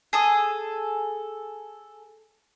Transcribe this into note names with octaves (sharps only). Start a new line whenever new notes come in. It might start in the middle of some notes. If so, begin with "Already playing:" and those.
G#4 A4 D#6